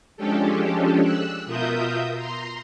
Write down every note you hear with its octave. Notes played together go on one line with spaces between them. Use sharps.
F3 G#3 C#4 D4 G4 A4
E6 F#6
B2 F4 A#4 E5 D#6 G6
A#5 C6